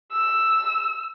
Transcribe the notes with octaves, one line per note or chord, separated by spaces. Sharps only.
E6